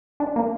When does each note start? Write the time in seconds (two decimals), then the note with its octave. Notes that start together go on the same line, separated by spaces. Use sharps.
0.20 D4
0.36 A#3